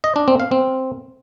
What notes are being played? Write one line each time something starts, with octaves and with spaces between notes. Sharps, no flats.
D#5
D4
C4
F5
C4